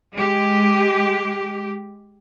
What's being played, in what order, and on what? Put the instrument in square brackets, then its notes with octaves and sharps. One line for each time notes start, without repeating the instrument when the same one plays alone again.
[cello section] G#3 G4